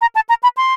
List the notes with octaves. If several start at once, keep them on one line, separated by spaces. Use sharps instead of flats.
A#5
A5
A#5
B5
C6